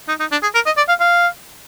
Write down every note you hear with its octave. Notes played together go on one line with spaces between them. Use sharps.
D#4
D#4
D4
G#4
A#4
D#5
D5
F5
F5